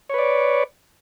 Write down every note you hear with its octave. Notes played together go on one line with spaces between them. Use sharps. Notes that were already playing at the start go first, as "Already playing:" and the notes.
B4 C#5 D5